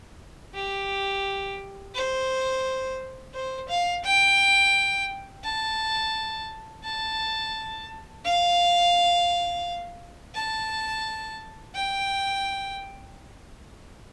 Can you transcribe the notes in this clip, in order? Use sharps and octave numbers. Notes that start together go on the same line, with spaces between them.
G4
C5
C5
F5
G5
A5
A5
F5
A5
G5